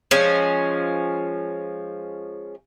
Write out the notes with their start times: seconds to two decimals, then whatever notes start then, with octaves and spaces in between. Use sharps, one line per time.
0.11 F3 G#3 C#4